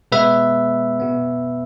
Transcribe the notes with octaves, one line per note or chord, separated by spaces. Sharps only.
B2 G#3 B3 B4 E5
B2 B3